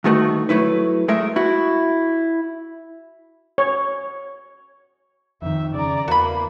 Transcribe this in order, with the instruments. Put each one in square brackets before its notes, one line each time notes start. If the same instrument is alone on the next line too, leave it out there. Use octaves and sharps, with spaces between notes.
[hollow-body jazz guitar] D2 G2 D#3 A3 D#4 F#4
F#3 A3 E4 B4
G#3 A3 A#4 E5
E4 F#4
[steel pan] C#5
[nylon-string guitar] F2 D#3 [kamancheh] E5
[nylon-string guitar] C#3 [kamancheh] D5 A#5
[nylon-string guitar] E2 [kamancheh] A#3 [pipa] F#4 B5